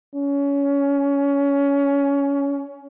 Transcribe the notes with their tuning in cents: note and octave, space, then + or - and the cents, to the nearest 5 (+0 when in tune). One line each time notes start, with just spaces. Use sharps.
C#4 +20